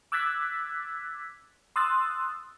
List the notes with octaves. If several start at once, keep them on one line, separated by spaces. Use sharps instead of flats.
D6 E6 F#6 G#6 A6 B6
C6 D#6 E6 F#6 A6